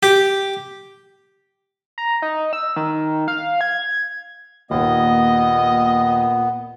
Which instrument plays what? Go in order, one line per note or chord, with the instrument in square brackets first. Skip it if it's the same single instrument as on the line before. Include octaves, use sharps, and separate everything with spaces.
[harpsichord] G4
[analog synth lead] A#5
D#4
E6
D#3
F5
G#6
[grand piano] D#2 [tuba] A#2 [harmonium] B3 [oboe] D#5